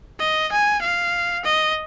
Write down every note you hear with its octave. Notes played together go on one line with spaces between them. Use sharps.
D#5
G#5
F5
D#5